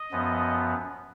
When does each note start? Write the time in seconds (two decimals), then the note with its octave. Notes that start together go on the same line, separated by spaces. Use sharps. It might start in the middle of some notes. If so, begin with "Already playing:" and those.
Already playing: D#5
0.12 F#2 F3 B3